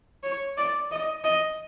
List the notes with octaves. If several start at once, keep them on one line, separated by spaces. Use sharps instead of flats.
C#5
D5
D#5
D#5